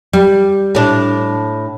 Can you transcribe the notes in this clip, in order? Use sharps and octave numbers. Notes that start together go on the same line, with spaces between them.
G3
A2 D4